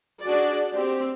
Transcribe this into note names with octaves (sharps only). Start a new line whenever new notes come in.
D4 F#4 G#4 D5
C4 G4